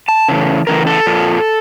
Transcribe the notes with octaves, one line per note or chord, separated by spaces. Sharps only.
A5
C#3 E3 A3
C#3 E3 A3 A#4
A4
A#2 F3 A#3